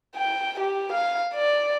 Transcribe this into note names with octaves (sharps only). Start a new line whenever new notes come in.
G5
G4
F5
D5